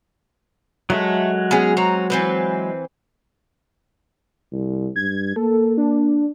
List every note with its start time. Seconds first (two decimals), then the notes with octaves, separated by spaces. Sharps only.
0.90 F#3 G#3 A3
1.51 B3 C#4 G#4
1.77 C4 C#4 A#5
2.10 E3 C4 B4
4.52 C2
4.96 G2 G#6
5.36 A#3 A4
5.78 D4